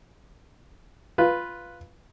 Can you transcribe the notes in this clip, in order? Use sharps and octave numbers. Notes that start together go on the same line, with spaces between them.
F4 B4